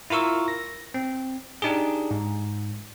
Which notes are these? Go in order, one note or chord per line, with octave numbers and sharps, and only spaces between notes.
E4 F4 A#4 C#6 E6
A#6
C4
D4 D#4 G4 G#4
G#2